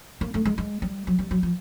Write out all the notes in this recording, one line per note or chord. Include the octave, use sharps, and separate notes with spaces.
A#3
A3
G#3
G#3
G3
F#3
G3
F#3
F3